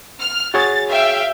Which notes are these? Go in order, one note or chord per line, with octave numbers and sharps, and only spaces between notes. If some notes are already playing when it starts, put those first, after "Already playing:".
F6
F#4 G#4 C#5 A6
E5 F5 G5